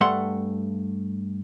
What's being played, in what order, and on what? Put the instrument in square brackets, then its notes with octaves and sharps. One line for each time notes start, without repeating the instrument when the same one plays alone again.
[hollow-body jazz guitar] G2 A3 F#5 C6